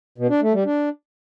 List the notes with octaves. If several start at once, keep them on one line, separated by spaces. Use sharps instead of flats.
B2
D4
A3
G3
D4